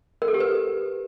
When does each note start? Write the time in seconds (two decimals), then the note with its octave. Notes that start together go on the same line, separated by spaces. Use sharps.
0.22 A#4
0.28 A4
0.34 G4
0.40 B4